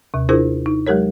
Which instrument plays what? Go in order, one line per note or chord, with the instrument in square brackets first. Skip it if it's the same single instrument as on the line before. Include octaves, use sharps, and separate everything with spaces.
[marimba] D#2 C3
D4 E4 F4 G#4 A#4 C5
D#4
F#3 G#3 G4 A#4 C#5